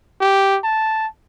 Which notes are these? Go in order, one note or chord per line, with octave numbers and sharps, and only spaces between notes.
G4
A5